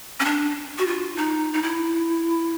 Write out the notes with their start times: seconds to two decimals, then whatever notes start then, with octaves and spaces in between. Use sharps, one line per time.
0.20 C#4
0.25 D4
0.78 F#4
0.86 F4
1.16 D#4
1.53 D#4
1.62 E4